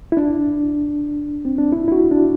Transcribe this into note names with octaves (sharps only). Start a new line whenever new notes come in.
E4
D4
C4
D4
E4
E4
F#4
D4